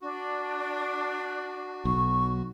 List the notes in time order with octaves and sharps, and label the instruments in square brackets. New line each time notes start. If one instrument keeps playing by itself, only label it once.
[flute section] D4 [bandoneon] F#4
[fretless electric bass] B1 [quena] C#6